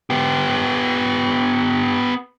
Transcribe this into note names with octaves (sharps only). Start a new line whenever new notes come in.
B3 G4